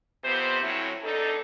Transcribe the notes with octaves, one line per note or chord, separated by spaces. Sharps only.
F2 C3 B3 C5
A2 F#3 C4 C#4 E4
E2 D4 D#4 A4